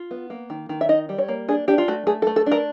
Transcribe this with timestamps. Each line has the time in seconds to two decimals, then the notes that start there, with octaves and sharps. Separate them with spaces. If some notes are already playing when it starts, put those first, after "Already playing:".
Already playing: F4
0.11 B3
0.30 A#3
0.50 D#3
0.69 D#3
0.81 E5
0.89 D#4 D#5
1.09 G3
1.18 C#5
1.28 A#3
1.49 D4 G#4
1.68 D4 G4
1.78 F4
1.88 A3 F#4
2.07 A3 G#4
2.22 A4
2.27 A3
2.36 A4
2.46 D4
2.52 A#4